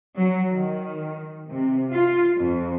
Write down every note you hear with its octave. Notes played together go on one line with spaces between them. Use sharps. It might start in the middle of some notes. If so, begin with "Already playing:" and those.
F#3
D#3
C3
F4
F2